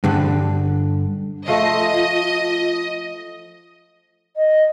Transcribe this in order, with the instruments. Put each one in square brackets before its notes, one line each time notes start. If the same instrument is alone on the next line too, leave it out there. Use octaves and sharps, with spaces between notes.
[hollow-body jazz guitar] G2 D3
[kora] F3 A3 [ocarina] F4 [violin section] D#5
[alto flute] D#5